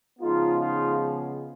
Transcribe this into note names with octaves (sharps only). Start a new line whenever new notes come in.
C#3 F3 G#3 B3 D#4 F4
D#4 F4